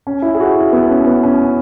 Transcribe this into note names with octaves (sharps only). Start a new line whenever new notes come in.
C#4
E4
G#4
F#4
E4
B3
C#4
B3
C#4